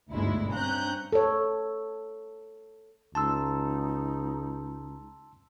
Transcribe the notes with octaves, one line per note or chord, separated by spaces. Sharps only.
G1 D2 G#2 B2 G#3 E4
G2 C4 C#4 A#5 F#6 G6
A4 C#5
C#2 D#4 A5 C6 E6